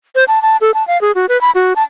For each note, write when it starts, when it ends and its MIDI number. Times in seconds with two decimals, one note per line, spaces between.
0.15 0.24 72
0.28 0.42 81
0.42 0.57 81
0.61 0.74 69
0.74 0.86 81
0.87 1.00 77
1.01 1.12 68
1.15 1.26 66
1.29 1.40 71
1.41 1.51 83
1.55 1.73 66
1.76 1.83 81